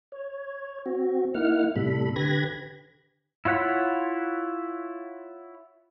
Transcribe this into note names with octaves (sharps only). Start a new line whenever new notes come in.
C#5
C4 F#4
A#3 D#4 E4 F#5 F6
A2 C3 G3 A4 B5
D3 G4 B4 B5 G#6 A#6
E4 F4 C#5 F#5 B5